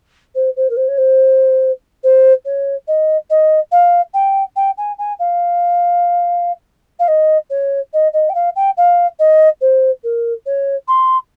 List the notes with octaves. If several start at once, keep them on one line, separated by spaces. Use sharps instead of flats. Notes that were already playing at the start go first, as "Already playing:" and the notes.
C5
C5
A#4
C5
C#5
C5
C5
C#5
D#5
D#5
F5
G5
G5
G#5
G#5
F5
F5
D#5
C#5
D#5
D#5
G5
F5
G5
F5
D#5
C5
A#4
C#5
C6